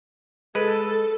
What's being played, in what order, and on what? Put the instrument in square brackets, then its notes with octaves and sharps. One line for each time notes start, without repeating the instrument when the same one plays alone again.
[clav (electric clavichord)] G#3 B4 [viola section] A4